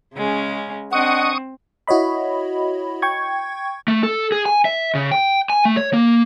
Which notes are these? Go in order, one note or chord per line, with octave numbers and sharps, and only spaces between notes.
C#3 G#3 C#4
C4 D4 D#5 F#5 C#6 D#6
E4 F#4 C#5 D#5 B5
G5 C#6 G#6
A3
A4
G#4
G#5
E5
C#3
G5
G#5
A3
C#5
A#3